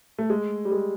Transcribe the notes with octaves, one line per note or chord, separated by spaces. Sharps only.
A3
G#3
G3
G#3